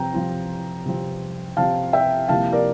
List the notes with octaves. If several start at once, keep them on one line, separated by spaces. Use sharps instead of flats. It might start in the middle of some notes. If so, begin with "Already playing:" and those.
Already playing: C3 F3 C4 G5 A#5
C3 F3 C4
C3 F3 C4
C3 F3 C4 F5 A5
E5 G5
C3 F3 A#3 E4 F5 A5
A#4 D5